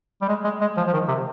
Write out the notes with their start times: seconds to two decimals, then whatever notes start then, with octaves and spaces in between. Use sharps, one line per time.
0.22 G3
0.29 G#3
0.44 G#3
0.61 G#3
0.77 F3
0.87 F3
0.93 D#3
1.08 C3